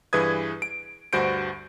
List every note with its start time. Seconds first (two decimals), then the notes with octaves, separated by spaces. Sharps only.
0.13 G2 E3 G#4 B4 D#6 G#6
0.62 D7
1.13 D2 G2 F#4 C5 G6 D7